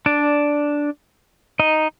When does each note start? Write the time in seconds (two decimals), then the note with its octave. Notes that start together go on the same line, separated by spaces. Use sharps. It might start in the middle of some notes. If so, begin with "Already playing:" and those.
0.06 D4 D5
1.60 D#4 D#5